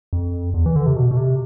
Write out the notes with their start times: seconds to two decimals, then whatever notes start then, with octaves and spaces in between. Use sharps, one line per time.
0.13 F2
0.54 E2
0.66 E3
0.76 D3
0.86 C3
0.96 B2
1.11 B2
1.17 C3